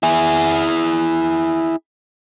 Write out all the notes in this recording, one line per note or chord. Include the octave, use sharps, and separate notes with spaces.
E4 G#4